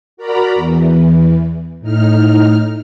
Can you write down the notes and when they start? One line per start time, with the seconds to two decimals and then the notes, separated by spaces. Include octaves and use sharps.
0.17 F#4 A#4 D5 A#5 B5
0.55 E2 E3
1.81 A2 D#4 F6